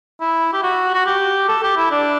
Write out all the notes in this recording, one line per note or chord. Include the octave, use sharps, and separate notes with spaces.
E4
G4
F#4
F#4
G4
A4
G4
E4
D4